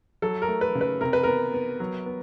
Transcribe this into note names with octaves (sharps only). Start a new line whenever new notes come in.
F#3 A4
A#4
A3
B4
C#3
B4
C3 A#4
B4
B3 A#4
B3
F#3
B3